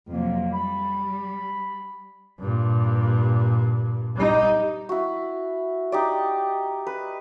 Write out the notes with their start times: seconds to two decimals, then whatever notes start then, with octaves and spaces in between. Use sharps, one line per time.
0.12 F2 C3 F#3 A#3
0.53 G3 B5
2.39 G2 A#2
4.16 G3 D#4
4.89 E4 F#4
5.92 D#4 G4 D5
6.87 B4